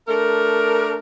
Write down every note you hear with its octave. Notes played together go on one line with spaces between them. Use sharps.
A3 D4 A#4